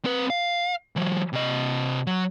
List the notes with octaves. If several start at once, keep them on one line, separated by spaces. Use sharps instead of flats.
C4 B4
F5
E3 F#3
C3 D#5
F#3